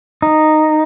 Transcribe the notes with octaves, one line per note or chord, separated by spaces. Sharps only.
D#4